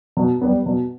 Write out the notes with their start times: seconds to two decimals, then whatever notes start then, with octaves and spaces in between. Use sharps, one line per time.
0.17 B2
0.41 G3 B3
0.66 B2